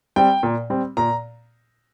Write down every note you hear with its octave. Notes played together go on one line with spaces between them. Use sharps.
G3 C4 G5
A#2
G3 C4
A#2 A#5